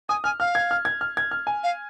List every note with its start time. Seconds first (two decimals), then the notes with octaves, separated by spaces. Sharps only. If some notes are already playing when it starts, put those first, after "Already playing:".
0.09 G#5 D#6
0.24 G#5 F6
0.40 F5 F6
0.55 G#6
0.71 F6
0.85 G#6
1.01 F6
1.17 G#6
1.31 F6
1.47 G#5
1.63 F5